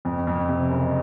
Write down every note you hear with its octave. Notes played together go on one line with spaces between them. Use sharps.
F2
F2
C3
F#1